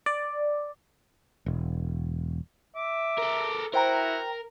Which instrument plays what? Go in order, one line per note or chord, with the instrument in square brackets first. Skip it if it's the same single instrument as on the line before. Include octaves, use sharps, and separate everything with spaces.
[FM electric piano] D5
[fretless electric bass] E1
[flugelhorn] E5 [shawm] D6
[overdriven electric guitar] A4 A#4
[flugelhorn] E4 [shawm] F#4 [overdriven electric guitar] A#4 [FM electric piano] C5 G5 A#5